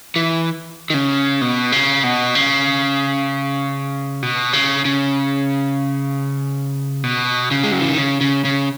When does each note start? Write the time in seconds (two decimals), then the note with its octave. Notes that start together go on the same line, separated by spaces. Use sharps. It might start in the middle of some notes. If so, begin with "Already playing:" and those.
0.16 E3
0.90 D#3
0.94 C#3
1.41 B2
1.72 C#3
2.04 B2
2.35 C#3
4.23 B2
4.53 C#3
4.85 C#3
7.04 B2
7.51 C#3
7.63 G#3
7.72 F#3
7.81 E3
7.89 D#3
7.97 C#3
8.21 C#3
8.45 C#3